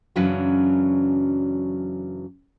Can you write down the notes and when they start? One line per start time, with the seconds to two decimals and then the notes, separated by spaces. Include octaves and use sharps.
0.16 F#2 C#3 E3 F#3 C#4 D4